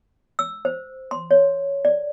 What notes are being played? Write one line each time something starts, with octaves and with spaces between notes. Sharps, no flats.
E6
C5
C6
C#5
D5